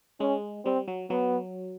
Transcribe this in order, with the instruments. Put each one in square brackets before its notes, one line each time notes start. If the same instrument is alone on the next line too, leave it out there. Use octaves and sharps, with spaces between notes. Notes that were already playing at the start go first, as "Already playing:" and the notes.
[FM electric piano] G#3 [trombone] C#4
[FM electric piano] G3 [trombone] C4
[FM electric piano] F#3
[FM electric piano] F#3 [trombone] B3